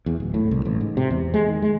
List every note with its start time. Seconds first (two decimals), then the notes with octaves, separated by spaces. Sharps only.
0.06 E2
0.20 D1
0.34 A2
0.51 C2
0.65 A1
0.81 G#2
0.97 C3
1.10 E2
1.34 G#3
1.48 D#3
1.62 G#3